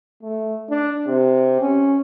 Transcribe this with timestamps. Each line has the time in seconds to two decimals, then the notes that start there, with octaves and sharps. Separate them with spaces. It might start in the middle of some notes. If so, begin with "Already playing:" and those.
0.23 A3
0.70 D4
1.07 C3
1.61 C#4